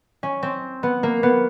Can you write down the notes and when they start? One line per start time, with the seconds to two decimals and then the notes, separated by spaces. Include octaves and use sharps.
0.23 C#4
0.43 C4
0.83 B3
1.03 A#3
1.23 B3